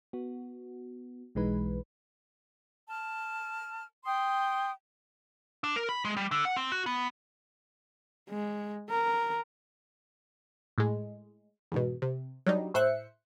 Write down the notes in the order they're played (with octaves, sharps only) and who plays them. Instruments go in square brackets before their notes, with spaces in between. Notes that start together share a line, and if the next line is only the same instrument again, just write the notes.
[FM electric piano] B3 F#4
B1 E3 G#3 D#4 B4
[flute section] A5 F6
G5 C6 D#6
[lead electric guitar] D4
A#4
B5
G#3
G3
D3
F#5
C4
F#4
B3
[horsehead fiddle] G#3
A#4
[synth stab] A2 G#3
E2 G#2 B2
C3
F#3 G3 D4 D#4
A2 C5 E5 F#6 C#7